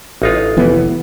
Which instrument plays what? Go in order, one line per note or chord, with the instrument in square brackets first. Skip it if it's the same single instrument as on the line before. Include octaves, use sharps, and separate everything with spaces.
[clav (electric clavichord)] A1 D#4 F4
[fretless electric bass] F1 E3 B3